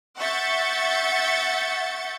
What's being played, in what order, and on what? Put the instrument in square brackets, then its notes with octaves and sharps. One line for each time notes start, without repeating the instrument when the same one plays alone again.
[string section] E5 F#5 C#6 G6 A6 C#7